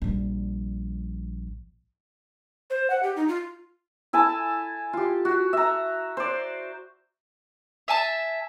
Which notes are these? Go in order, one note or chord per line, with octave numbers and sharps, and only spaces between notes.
A#1 G3
C5
F#5
G4
D#4
F4
E4 A4 G#5 A5
F4 G4
F#4
E5 A#5
C5 D5
E5 G#5 A5